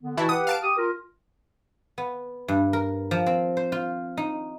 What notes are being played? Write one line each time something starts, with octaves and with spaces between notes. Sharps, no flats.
D3 B3
B2 E3 E4 F#4 A5
G4 B4 F#5 D#6
F5 A5 D7
G4 D#6
F4 A#4
B3
G2
A#4
F3
C4
C5
F4
D#4